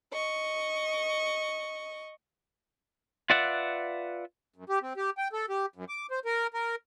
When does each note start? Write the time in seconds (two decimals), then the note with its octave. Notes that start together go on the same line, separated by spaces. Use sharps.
0.12 D#5 C#6
3.30 F4 B4 D5 E5 F#5
4.56 F#2
4.69 G4
4.82 C4
4.97 G4
5.18 G5
5.33 A4
5.49 G4
5.76 F#2
5.89 D6
6.11 C5
6.25 A#4
6.54 A#4